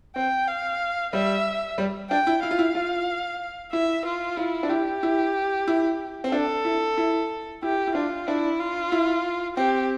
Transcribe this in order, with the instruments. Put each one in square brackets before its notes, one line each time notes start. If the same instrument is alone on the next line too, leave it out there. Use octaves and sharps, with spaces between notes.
[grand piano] C4 [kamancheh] G5
[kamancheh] F5
[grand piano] G3 [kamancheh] E5
[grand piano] G3
[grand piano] D4 [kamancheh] G5
[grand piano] E4
[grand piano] E4 [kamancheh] F5
[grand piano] F4
E4
F4
[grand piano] E4 [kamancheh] E5
[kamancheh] F4
[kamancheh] E4 [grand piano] F4
[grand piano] D4
[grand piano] E4 [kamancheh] G4
[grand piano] E4
E4
C4
[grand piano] D4 [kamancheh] A4
[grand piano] E4
E4
[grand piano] E4 [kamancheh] G4
[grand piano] E4
[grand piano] D4 [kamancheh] F4
[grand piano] D4 [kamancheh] E4
[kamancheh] F4
[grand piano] E4
[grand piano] C4 [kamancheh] G4